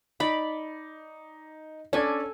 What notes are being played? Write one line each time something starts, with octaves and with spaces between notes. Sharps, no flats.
D#4 D5 B5
C#4 D4 A4 D5 G#5